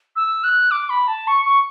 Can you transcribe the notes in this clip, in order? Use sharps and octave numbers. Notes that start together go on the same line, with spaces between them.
E6
F#6
D6
B5
A5
C#6
C#6